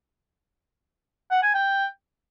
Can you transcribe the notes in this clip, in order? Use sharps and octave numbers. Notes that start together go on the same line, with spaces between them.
F#5
G#5
G5